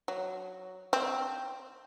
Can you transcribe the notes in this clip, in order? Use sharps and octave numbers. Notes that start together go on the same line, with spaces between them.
F#3
C4